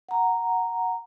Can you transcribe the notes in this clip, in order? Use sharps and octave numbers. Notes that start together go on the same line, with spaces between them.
F#5 A#5